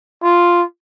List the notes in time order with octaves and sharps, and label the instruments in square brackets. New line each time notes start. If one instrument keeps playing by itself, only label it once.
[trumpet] F4